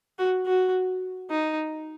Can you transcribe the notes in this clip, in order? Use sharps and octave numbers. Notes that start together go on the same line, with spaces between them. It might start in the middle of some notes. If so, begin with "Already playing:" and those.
F#4
F#4
D#4